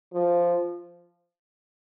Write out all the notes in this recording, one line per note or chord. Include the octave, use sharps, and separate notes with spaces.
F3